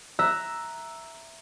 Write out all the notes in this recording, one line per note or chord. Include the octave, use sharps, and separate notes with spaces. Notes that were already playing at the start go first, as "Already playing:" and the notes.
E5 A#5 E6 F#6